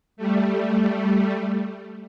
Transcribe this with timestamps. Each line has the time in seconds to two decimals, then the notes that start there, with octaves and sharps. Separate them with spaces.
0.17 G3 A3